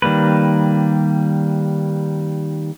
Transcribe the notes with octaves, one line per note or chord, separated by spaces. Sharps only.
D#3 G3 A#3 B4